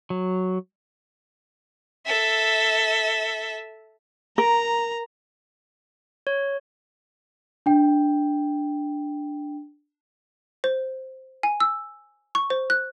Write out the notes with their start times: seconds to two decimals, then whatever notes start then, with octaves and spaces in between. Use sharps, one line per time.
0.10 F#3
2.06 A4 E5
4.38 A#4 A#5
6.27 C#5
7.66 D4 G5
10.64 C5
11.43 G#5
11.60 E6
12.35 C#6
12.50 C5
12.70 F#6